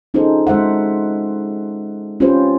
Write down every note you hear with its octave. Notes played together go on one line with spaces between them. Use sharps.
C#4 D#4 F4 G#4 A4 C5
G#3 C5 E5 F#5
C#4 F4 G4 B4 C5